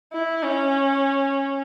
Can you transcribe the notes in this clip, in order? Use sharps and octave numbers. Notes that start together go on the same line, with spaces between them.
E4
C#4